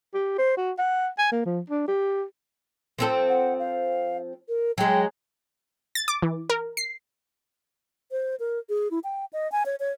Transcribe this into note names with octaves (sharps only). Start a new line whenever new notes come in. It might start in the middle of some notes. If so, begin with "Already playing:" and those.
G4
C5
F#4
F#5
G#5
A#3
F3
D4
G4
F3 C4 A4
F#5
F5
A#4
F#3 G#3 G5
A6
D6
E3
A#4
C7
C5
A#4
G#4
E4
G5
D#5
G#5
C#5
C#5